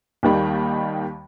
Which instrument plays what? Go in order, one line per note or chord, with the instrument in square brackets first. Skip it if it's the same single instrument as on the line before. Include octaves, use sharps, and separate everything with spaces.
[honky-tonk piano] D#2 D#3 G3